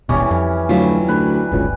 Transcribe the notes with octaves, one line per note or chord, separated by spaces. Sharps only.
D#1 G#1 B2 E3 G3 C#4
F2
D2 F#3 E4 F4
D2 B4
D1 G1 C#2